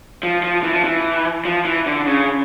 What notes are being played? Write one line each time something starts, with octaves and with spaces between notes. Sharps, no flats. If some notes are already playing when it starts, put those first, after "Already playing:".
F3
F3
E3
F3
E3
F3
E3
D3
C#3